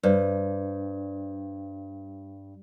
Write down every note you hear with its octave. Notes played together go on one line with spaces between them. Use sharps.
G2 B4 C5 D5